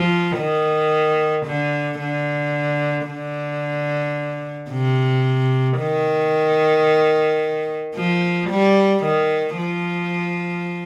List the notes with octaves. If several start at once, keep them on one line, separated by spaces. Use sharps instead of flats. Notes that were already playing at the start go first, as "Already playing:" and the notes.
Already playing: F3
D#3
D3
D3
D3
C3
D#3
F3
G3
D#3
F3